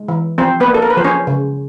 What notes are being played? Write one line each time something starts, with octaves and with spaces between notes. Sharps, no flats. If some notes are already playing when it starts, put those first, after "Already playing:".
Already playing: G#3
E3
F3 C4 C5
B3 B4
A#3
A4
A#4
B4
F3 C5
C#4 C#5
C#3